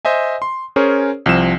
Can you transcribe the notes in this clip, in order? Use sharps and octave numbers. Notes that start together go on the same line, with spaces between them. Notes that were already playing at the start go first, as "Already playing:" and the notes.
C5 D#5 E5 G#5
C6
C#4 G#4 A#4 C5 C#5
C2 F3 C4 E7